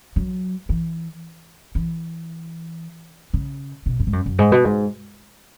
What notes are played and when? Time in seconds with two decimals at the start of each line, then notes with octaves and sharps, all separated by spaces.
0.16 F#3
0.69 E3
1.75 E3
3.33 C#3
3.86 B2
3.99 F#2
4.07 G#2
4.13 F#2
4.26 F#2
4.39 G#2
4.52 B2
4.65 G#2